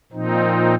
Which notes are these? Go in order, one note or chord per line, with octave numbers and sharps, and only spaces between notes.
A#2 F3 C4 D#4